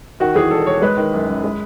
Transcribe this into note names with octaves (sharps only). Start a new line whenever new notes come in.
D#3 F#4
E2 G#4
E1 A4
E1 C#5
G#3 B4
D#3
F#2
F#2
G#3